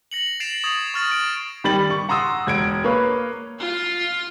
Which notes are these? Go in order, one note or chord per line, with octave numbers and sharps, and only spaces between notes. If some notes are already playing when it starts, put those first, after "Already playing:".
A#6 C#7 F#7
A6 C7 D7 E7 F7
C#6 D#6 G#6 A6
C#6 F6 A6 D#7
D7
D#3 G3 B5 A6 F#7
C#6
F#5 A#5 C6 D#6 E6
E1 G#6 D7
A#3 B4 C#5 F5
F4 C6